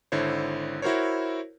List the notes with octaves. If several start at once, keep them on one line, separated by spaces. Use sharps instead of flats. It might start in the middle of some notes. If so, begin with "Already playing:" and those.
G#1 D3 E4 C5 C#5
E4 F#4 A#4 C5 C#5